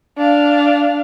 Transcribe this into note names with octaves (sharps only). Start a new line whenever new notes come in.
D4 F5